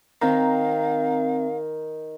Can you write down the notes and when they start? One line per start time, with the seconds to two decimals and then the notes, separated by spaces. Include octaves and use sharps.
0.21 D#3 C4 F5 A#5